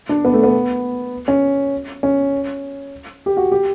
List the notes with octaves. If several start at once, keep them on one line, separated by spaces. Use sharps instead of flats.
D4
B3
A3
B3
C#4
C#4
G4
F#4
G4